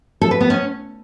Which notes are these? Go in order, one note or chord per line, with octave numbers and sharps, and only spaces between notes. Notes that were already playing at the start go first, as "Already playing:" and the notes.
A4
B4
B3
C#4